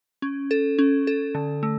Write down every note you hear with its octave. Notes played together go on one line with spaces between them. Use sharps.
C#4
A4
C#4
A4
D3
A3